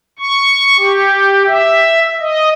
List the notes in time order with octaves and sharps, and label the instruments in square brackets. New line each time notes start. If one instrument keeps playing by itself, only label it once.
[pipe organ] C#6
G4
E5
D#5